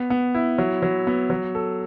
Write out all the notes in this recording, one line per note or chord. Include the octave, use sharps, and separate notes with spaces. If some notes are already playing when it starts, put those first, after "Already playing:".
Already playing: B3
B3
E4
F#3
F#3
B3
F#3
A4